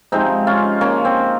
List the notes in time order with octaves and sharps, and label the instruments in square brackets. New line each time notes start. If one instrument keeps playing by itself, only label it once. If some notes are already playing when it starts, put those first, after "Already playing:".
[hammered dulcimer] C3 F3 G#3 C4 D#4
C#4 F4
A#3 C#4
C4